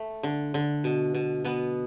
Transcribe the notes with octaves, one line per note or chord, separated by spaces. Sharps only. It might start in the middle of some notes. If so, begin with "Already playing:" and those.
Already playing: A3
D3
D3
B2
B2
B2 B3